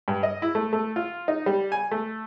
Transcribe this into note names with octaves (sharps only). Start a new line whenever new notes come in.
G2
D#5
E4
A3
A3
F4
D#4
G3
G#5
A3